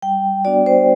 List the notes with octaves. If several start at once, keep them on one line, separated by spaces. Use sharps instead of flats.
G3 G5
B3 D4 F#4 D5
C5